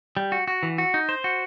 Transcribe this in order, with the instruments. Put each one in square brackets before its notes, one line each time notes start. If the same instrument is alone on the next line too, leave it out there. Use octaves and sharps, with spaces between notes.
[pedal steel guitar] G3
F#4
F#4
E3
F#4
D#4
C5
F#4